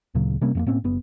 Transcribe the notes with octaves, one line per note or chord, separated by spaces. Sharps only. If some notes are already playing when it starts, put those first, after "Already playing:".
D2 A#2 C#3 F#3
C3 G3 A#3 C#4
F2 A3 A#3
A2 A#3 C4 C#4
F#1 B3